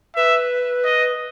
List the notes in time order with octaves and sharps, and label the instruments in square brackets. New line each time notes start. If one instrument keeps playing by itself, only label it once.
[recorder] B4 [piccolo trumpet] E5
[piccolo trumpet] D#5